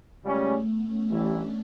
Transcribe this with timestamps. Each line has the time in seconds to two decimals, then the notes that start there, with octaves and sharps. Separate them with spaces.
0.24 C#2 C#3 G3 A3 C#4
0.53 B3
0.81 C#4
1.10 A1 G2 E3 D4